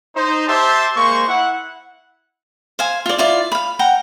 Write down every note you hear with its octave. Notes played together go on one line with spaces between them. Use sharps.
D#4 C5
G4 C5 E5 A5 C6
G#3 A#3 C5 C#6
E4 F#5
C5 F5 G#5
F4 D5
E4 F4 D5
F5 B5
F#5 G5 A#5